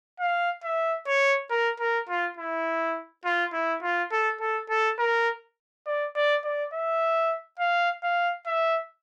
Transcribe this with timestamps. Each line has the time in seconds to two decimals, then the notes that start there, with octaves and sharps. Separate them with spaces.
0.20 F5
0.64 E5
1.07 C#5
1.51 A#4
1.80 A#4
2.09 F4
2.37 E4
3.25 F4
3.53 E4
3.83 F4
4.12 A4
4.41 A4
4.70 A4
4.99 A#4
5.87 D5
6.16 D5
6.44 D5
6.74 E5
7.60 F5
8.03 F5
8.47 E5